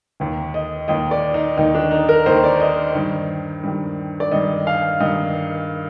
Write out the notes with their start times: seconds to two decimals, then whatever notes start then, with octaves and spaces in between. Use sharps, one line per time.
0.20 D#2 D#3
0.54 D#5
0.88 D#2 D#3 D#5
1.11 D5
1.34 D#4
1.57 D#2 D#3 D#4
1.75 D4
1.91 D#4
2.09 A#4
2.26 D#2 D#3 C5
2.44 D5
2.60 D#5
2.95 G2 D#3
3.63 G2 D#3
4.20 D5
4.31 G2 D#3 D#5
4.67 F5
5.00 G2 D#3 D#5